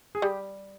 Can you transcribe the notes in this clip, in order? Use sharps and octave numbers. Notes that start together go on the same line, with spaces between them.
G#4
G3 G4